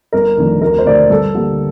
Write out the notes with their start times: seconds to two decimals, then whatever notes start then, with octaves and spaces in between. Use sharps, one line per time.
0.12 G1 A#4
0.37 F2 D#3 A3 D4
0.62 D2 A#4
0.78 C5
0.86 D3 A3 D4 D5
1.10 G2 A4
1.35 D3 G3 A#3